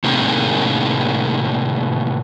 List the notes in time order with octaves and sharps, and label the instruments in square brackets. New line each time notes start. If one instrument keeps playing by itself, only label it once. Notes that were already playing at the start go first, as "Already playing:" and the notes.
[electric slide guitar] A2 C3 D#3 G#3 A#3 C4